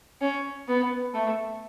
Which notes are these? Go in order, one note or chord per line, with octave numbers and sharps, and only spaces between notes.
C#4
B3
A3